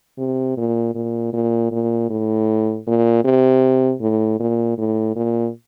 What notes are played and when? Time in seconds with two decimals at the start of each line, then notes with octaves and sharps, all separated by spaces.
0.18 C3
0.57 A#2
0.95 A#2
1.33 A#2
1.71 A#2
2.10 A2
2.87 A#2
3.24 C3
4.01 A2
4.40 A#2
4.78 A2
5.16 A#2